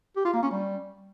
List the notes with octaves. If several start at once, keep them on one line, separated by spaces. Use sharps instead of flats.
G4
F4
A#3
C#4
G3